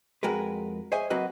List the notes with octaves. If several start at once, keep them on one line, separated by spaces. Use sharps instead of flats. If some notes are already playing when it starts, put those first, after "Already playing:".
F2 G#3 F#4 A#4 B4
G#4 C5 C#5 D#5 E5 G#5
F#3 A#3 C4 F#4 B4 D#5